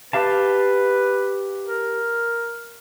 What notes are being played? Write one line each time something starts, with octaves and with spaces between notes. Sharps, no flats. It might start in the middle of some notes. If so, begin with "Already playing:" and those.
G4 B4 F5 A5
A#4